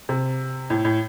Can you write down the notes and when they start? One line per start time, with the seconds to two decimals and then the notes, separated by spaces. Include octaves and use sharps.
0.09 C3
0.70 A2
0.85 A2